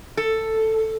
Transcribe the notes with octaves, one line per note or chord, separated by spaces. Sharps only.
A4